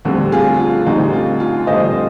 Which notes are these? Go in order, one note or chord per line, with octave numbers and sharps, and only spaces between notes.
D2 D3 G3 C4
F4 G#4
F4
D2 D3 G3 C4 D#4
F4
F4
D2 D3 G3 C4 C5 D#5